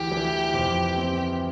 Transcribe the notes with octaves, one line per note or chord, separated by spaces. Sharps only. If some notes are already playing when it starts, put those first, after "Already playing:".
Already playing: D2 E3 G4
E3
F2
C4